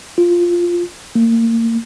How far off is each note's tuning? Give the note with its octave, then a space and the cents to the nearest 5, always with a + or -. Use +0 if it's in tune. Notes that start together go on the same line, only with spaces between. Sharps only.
F4 +0
A#3 -30